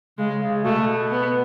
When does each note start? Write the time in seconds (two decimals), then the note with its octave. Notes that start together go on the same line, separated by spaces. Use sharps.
0.18 C#3 G#3
0.42 C#3
0.64 B2 A3
1.11 B3